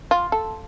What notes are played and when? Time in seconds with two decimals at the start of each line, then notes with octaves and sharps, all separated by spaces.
0.11 F4
0.32 A4